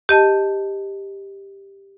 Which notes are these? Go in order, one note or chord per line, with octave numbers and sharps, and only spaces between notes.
G4 D#5 A5